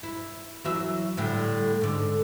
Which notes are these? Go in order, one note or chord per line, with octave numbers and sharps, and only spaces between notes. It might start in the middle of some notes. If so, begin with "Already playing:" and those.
E4
E3 F#3 E5
A2 D3 G3
G#2 D3